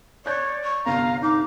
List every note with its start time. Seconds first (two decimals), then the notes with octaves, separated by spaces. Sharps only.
0.26 C#5 D5 F#6 G6
0.64 C#6
0.86 G1 C2 D4 F5 A#5
1.23 D#4 D6